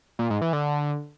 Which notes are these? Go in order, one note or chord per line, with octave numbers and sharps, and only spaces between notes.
A#2
G#2
E3
D3